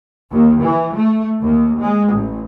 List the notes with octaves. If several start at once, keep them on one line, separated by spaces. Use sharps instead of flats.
D#2
E3
A3
D#2
G#3
A1